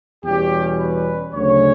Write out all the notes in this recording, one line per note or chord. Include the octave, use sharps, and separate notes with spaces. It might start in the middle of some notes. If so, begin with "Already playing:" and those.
E2 B2 G3 C#4 G4
B4
D2 C#3 F#3 C#4 C#5